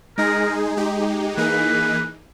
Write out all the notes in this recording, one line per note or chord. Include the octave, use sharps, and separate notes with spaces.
G#3 D#4 G#4 A#4
G#3 D#4 G4
E3 A#3 D#4 G#4 B4